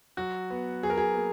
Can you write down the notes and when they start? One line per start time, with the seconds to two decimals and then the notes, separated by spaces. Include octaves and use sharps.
0.17 F#3 F#4
0.50 B3
0.83 F#3 G#4
0.90 A#4
0.98 G#4
1.15 A#3